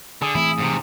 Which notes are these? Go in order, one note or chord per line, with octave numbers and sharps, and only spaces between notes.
D3 G#4
E3 A3 C4 E4
G#2 C3